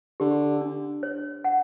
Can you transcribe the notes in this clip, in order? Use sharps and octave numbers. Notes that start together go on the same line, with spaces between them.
D3 G4
D4
C#5
F#5